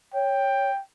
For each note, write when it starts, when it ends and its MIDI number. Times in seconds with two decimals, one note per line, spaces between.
0.14 0.71 73
0.14 0.80 79